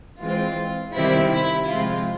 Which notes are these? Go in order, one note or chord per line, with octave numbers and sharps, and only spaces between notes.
E3 G#3 C4 F4
C3 D#3 G3 C4 E4
E4
C3 F3 G#3 C4 F4